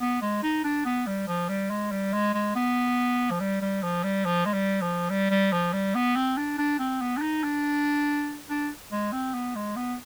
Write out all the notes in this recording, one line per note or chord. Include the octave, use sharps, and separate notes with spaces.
B3
G#3
D#4
D4
B3
G3
F3
G3
G#3
G3
G#3
G#3
B3
F3
G3
G3
F3
G3
F3
G#3
G3
F3
G3
G3
F3
G3
B3
C4
D4
D4
C4
B3
D4
D#4
D4
D4
G#3
C4
B3
G#3
B3